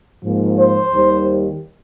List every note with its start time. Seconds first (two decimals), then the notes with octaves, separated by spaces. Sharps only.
0.22 G#2 F3 A#3
0.58 C5
0.94 D#2 D#3 G3